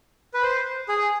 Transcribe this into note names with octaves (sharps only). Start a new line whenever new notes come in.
B4
C5
G#4